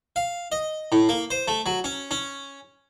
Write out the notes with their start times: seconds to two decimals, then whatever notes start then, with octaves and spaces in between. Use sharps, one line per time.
0.16 F5
0.52 D#5
0.92 A2
1.09 A#3
1.30 C5
1.48 A3
1.66 F#3
1.84 C#4
2.11 C#4